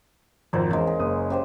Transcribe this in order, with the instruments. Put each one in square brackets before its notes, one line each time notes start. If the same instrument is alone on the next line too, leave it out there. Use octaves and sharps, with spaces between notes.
[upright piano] G#1 F2 [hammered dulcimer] A#4 C5
[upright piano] E2 [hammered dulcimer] C#3 G#3
[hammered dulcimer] G#4
[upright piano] F#1 D#6
[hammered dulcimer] C#3 G4 C5